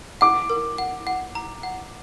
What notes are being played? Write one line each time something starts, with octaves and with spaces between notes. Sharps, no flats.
F#5 D6
A#4
F#5
F#5
A#5
F#5